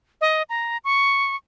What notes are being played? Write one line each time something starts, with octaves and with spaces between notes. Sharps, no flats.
D#5
A#5
C#6